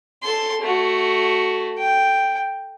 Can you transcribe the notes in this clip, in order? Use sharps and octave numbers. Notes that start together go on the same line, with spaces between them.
A4 C6
A3 F#4
G5